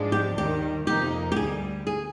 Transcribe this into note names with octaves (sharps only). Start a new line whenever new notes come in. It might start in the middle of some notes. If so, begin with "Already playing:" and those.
Already playing: G#2 F3 G#3 D4
G4
D#2 D#3 G3 G4
F2 C3 F3 A#3 D#4 G4
G4
D2 D3 G3 G#4
G#4